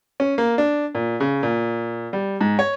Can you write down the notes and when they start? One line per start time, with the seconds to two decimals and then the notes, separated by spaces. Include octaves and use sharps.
0.20 C#4
0.38 A#3
0.58 D4
0.95 A#2
1.20 C#3
1.43 A#2
2.13 G3
2.41 G#2
2.59 C#5